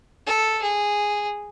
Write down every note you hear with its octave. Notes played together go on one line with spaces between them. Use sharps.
A4
G#4